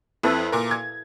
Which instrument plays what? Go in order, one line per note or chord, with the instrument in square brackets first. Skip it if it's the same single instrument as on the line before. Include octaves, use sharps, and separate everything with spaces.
[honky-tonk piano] F2 [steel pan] E4 A4 B4
[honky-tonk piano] A#2 A#4
G#6